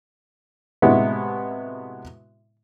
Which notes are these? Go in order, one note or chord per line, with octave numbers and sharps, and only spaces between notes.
A2 C3 G#3 B3 E4 F#4